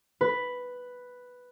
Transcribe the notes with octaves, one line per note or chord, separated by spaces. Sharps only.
B4